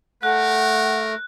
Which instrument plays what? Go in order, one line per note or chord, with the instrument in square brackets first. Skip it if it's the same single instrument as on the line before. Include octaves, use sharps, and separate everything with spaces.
[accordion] A3 [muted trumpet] A#4 [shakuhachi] F#5 [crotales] F#6